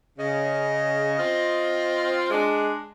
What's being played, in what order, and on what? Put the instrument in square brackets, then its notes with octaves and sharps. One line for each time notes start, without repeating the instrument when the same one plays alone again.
[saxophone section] C#3 [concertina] D#5
[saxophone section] C4 F4
G#3 D4